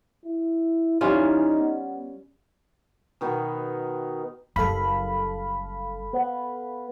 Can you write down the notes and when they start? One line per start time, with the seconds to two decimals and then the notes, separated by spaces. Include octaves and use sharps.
0.25 E4
1.01 E3 G3 C#4 D#4 F4
1.58 B3
3.21 B2 D#3 B3 D#4
4.56 F#1 G3 A4 F5 B5
6.13 B3